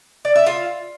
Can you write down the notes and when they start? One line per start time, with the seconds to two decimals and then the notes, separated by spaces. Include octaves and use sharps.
0.25 D5
0.36 E5
0.46 F4